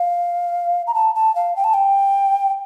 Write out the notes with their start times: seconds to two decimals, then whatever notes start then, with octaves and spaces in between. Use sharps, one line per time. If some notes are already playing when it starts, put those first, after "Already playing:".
Already playing: F5
0.87 A#5
0.94 A5
1.15 A5
1.35 F5
1.56 G5
1.64 A5
1.74 G5